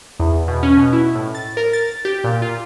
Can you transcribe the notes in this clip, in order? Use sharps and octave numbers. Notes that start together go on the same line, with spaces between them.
E2
B2
C#4
B2
E4
A2
A6
A#4
A6
G4
A#2
F4